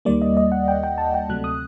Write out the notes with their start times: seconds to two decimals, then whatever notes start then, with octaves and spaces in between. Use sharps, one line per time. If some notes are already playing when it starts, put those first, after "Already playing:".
0.05 D#2 D#3 G3 A#3 D5
0.22 D#5
0.37 D#5
0.52 F#5
0.68 G5
0.83 G5
0.98 A5
1.14 G5
1.29 D2 C3 F#3 A3 F#6
1.44 D#6